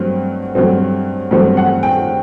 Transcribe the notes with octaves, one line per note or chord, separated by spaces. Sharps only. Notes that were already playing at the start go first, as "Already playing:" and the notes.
Already playing: G2 F#3 A3 C4
G2 F#3 A3 C4
G2 F#3 A3 C4
F#5
G5